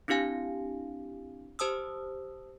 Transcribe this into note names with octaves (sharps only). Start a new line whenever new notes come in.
C4 D4 E4 G4 F5 G#5
G4 C5 A5 D#6 E6